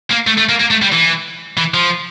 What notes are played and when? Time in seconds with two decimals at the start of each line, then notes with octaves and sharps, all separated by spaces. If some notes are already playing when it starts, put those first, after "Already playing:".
0.11 A#3
0.27 A3
0.38 A3
0.49 A#3
0.60 A#3
0.71 A3
0.82 G3
0.92 E3
1.57 E3
1.74 F3